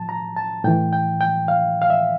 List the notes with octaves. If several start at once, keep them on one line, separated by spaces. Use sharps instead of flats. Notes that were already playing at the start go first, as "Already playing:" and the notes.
Already playing: A2 F3 A5
A#5
A5
A2 E3 G5
G5
G5
F5
F5
E5